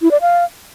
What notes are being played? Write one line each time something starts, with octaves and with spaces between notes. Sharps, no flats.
E4
D5
F5